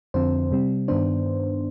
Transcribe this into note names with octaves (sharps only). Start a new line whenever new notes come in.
F2 D3 F3 C4 C5
C3 G3 C4
G2 D#3 B3 D4 C5